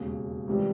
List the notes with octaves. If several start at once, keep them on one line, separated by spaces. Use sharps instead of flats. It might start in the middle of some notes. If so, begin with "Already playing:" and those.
Already playing: E1 D#2 C#3
C#2 C3 E3 G3